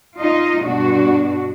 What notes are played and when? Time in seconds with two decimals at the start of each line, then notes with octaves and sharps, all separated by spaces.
0.18 D#4 F4 D#5
0.63 G2 B2 D4 F#4